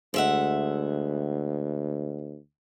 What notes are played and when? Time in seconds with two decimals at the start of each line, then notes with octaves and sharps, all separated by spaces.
0.14 D2 G#3 E5 F#5